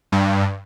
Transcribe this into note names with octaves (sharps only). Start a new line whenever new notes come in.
G2